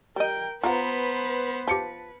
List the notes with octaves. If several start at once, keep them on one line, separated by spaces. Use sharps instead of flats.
G3 A#4 D#5 G5
B3 F4 B4 C5 D5 F#5 A#5
F3 G4 A5 C#7